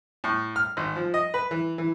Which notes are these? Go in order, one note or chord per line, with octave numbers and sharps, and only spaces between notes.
A2
F6
G#1
F3
D#5
B4
E3
E3